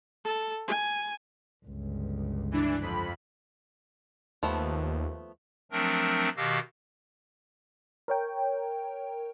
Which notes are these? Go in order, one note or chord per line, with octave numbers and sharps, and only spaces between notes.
A4
G#5
G1 C#2
E3 D4
F2 B5
D#2 F3 A3 B3
F3 F#3 A3 C4 D4 A#4
B2 D#3 F#4 G4 F5 E6
A#4 C#5 G5